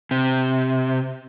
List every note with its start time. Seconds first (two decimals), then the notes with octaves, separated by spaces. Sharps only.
0.11 C3